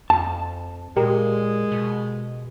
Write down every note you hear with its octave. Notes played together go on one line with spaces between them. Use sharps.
F2 A5
A#2 G#3 G4 A#4
B2